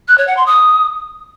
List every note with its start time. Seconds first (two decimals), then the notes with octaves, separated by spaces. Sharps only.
0.08 F#6
0.18 C#5
0.27 F#5
0.37 C6
0.46 D#6